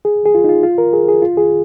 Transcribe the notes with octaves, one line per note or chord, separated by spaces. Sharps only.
G#4
G#4
F4
D#4
F4
F4
A#4
G#4
G#4
F4
G#4